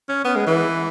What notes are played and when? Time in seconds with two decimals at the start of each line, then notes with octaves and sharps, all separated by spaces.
0.09 C#4
0.25 B3
0.36 G#3
0.47 E3